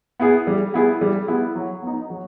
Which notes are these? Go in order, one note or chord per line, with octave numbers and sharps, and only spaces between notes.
B3 E4 G#4
G3
B3 E4 G#4
G3
B3 E4 G#4
F#3
B3 D#4
F#3